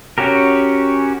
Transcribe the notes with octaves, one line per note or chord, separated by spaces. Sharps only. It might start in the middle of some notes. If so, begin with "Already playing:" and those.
C#4 F#4 G4 A#4